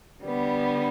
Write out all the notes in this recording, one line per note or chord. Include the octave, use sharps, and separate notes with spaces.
D3 G3 B3